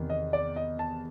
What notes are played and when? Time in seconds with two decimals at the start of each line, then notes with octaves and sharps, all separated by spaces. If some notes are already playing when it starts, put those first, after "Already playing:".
Already playing: E2 C3 D#3
0.10 D#5
0.33 D5
0.56 D#5
0.79 A5